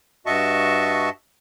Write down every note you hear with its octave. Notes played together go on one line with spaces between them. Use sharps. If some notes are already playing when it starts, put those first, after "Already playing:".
G2 F#4 D#5 E5 A5 C#6